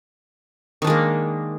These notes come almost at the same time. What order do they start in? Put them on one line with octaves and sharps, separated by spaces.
D#3 D4 G#3 A#3